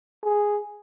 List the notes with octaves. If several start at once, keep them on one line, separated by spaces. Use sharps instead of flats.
G#4